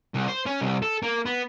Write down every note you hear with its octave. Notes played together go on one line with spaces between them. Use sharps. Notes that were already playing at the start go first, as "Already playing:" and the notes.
C2
C5
C#4
C2
A4
A#3
B3